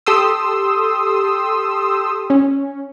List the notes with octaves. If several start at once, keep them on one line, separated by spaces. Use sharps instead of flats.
G4 A4 C6 D#6 E6
C#4